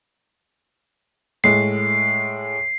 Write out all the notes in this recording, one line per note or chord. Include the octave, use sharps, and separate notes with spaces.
A2 G#3 C7